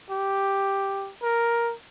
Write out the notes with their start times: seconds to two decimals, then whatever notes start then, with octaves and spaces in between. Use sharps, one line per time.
0.11 G4
1.23 A#4